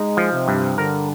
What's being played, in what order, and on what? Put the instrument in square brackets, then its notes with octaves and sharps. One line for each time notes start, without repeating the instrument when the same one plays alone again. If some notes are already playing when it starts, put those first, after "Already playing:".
Already playing: [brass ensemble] G#3 [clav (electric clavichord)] D#4
[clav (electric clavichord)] F3
[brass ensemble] C3
[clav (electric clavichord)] G2
[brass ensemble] D3 [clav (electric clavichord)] A#4